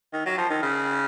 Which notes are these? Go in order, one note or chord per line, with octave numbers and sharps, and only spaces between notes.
D#3
F#3
F3
D#3
C#3